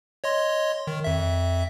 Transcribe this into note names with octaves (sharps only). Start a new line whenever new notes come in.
C#5 D#5 C6
D#3
F2 E5